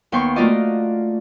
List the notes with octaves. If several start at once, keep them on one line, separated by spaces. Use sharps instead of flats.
D#2 B3 G5 C6 C#6
A3 A#3 F4 F#4 D5 D#5